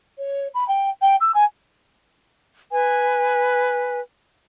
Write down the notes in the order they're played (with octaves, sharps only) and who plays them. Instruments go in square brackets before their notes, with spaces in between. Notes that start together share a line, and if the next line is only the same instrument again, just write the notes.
[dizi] C#5
B5
G5
G5
E6
G#5
[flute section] B4 G#5